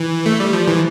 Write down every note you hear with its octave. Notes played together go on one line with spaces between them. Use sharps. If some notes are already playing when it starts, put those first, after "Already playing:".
Already playing: E3
A3
G3
F3
E3